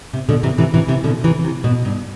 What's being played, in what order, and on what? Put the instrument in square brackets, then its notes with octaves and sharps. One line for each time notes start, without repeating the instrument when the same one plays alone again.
[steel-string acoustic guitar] C3
B2 D3
C3 E3
C3 E3
C3 E3
C3 E3
B2 D3
C3 E3
C3
B2
G2